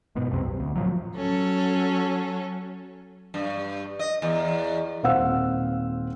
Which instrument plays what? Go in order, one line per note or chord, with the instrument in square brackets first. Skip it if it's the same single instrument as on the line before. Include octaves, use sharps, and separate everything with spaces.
[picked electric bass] F#1 G#2 B2
B1 F2 C3 C4
B1
D2
A2 F3 F#3
[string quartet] F#3 C#4 A4
[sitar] G2
D#5
E2
[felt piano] D#1 C4 F5 F#5 E6